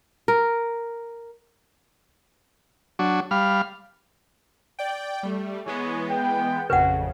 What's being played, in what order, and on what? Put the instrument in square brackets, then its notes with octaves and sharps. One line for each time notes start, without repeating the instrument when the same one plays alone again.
[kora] A#4
[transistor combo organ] F#3 D4 F#4
G3 F5 B5 F6
[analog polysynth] D5 G5
G3 A3
[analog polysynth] E3 G#3 B3 [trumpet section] C#5 G#5
[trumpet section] G5
[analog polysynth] A1 F2 C#3 [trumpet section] C#4 F#4 [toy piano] B4 F#5